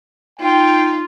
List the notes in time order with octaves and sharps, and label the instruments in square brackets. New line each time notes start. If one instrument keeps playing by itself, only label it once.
[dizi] D#4 [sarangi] F4 [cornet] G5